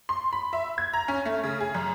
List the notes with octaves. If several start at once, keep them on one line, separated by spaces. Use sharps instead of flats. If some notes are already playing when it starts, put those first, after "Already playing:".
C6
B5
E5
G#6
A#5
C#4
A3
C#3
G#4
F#2